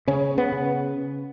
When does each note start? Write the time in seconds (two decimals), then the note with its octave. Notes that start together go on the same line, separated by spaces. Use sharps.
0.08 C#3 C#4
0.38 B3
0.52 C#3